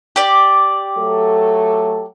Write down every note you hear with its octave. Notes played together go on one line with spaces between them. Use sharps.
G4 D5
F#3 A3 A4